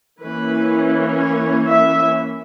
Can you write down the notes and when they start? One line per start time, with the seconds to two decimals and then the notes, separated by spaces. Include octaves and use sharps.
0.23 E3 A#3 C#4 B4
1.20 C#5
1.68 E5